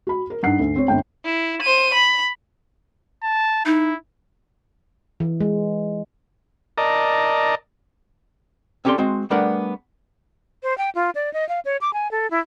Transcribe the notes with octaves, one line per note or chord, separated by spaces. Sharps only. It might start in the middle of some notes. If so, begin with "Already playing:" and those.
F#4 B5
A#4
G2 D#4 F#5 C7
D2
C4 C#5
G1 C4 G5
E4
C5 D#7
B5
A5
D#4 E4
E3
G#3
A#4 D5 D#5 A5 A#5
C4 C#4 G4 A4 D5 C6
G#3 C4 F#4
G3 A3 B3 D4 A#4 F#5
C5
G5
F4
D5
D#5
F5
C#5
D6
G#5
A4
E4